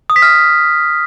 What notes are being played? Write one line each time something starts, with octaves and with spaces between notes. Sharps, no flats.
D#6
B6
F6